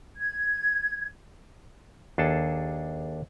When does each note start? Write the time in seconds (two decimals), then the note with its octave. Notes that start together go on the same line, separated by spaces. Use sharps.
0.17 G#6
2.18 D#2 D4 G#4 A4 A5